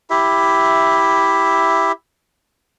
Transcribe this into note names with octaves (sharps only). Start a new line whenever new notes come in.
E4 G4 E5